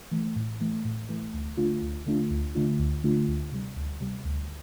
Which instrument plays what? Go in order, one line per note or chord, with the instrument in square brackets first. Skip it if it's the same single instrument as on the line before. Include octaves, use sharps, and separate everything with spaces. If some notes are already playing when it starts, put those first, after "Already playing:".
[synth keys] E3 A3
A2
E3 A3
A2
E3 A3
D2
D3 A3 D4 F4
D2
D3 A3 D4 F4
D2
D3 A3 D4 F4
D2
D3 A3 D4 F4
D2
C3 G3
D2
C3 G3
D2